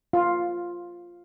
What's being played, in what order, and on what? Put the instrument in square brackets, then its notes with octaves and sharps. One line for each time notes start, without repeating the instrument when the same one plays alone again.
[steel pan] F4